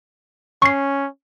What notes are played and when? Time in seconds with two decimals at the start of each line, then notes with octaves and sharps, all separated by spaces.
0.62 C#4 C#6 C7